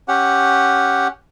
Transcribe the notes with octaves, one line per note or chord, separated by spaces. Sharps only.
C#4 G4 F#5